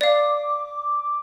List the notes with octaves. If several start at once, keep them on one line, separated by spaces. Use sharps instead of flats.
D5 F5 D6